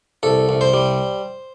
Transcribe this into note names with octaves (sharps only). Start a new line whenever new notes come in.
C2 A4
C2
C5
G3